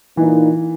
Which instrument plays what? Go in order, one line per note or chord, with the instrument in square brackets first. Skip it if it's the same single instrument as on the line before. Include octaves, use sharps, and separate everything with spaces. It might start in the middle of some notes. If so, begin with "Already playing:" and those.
[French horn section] A#2 A#3 D#4 [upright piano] E3